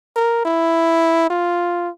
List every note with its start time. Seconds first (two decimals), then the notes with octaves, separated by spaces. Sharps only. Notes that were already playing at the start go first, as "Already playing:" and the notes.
0.16 A#4
0.45 E4
1.30 F4